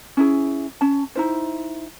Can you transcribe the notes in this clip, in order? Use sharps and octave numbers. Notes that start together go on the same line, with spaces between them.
C#4 E4 G#4
C#4 A5
D#4 E4 C5